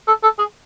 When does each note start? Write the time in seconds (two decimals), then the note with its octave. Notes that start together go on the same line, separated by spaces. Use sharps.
0.08 A4
0.23 A4
0.39 G#4